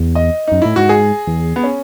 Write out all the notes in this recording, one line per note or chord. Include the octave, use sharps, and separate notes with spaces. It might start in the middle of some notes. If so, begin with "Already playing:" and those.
Already playing: E2
D#5
F#2 D#4
A2 E4
G#2 F#4
G#4
E2
B3
C#4